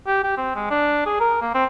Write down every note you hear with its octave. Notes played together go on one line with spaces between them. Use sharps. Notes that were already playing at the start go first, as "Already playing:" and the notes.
G4
G4
C4
G#3
D4
G#4
A#4
A#3
C4